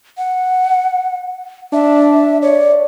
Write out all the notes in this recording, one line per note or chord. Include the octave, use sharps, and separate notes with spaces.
F#5
D4 E5
C#5 D5